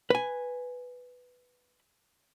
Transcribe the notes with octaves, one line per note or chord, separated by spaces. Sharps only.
B4 G#5